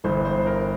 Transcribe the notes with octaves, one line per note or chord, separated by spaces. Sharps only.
G1 G2 E3 C5
C5
A#4